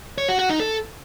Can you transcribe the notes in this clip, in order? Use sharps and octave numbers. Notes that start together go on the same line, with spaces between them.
C#5
F#4
F#4
D#4
A4